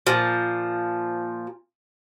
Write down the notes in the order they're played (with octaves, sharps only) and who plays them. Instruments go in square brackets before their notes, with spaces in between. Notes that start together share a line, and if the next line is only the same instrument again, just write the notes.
[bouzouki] A#2 F3